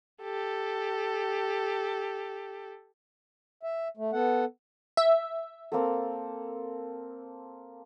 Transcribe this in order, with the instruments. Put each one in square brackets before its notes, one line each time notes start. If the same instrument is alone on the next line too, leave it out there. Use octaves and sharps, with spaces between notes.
[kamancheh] G4 A4
[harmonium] E5
A3
B3 A4 F#5
[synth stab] E5
[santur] A#3 C4 A4